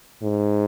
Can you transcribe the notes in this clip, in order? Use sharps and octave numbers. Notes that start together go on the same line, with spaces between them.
G#2